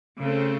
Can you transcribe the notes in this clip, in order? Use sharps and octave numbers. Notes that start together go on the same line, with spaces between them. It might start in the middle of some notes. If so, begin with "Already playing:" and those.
C#3 A3 C4